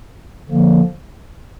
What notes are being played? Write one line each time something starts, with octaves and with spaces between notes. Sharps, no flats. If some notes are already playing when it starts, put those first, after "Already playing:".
D3 F3 A#3